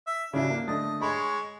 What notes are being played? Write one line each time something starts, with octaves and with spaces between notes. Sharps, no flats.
E5
C#3 D4 E4 F#4
A#3
D3 A3 D#5 A6
G#3 C#5 B5